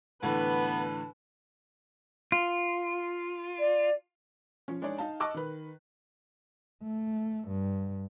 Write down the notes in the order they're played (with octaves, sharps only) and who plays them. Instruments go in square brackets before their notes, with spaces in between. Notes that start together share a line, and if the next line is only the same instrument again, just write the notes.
[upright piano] A2 D3 E3 [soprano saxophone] B3 [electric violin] B4 [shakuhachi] A5
[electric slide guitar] F4
[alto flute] D5
[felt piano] F3 C#4
G#3 D4 D#4 C#5 D5
D#4 F5 A5
D#5 A5 C#6 D6 E6 F#6
D#3 B4
[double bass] A3
G2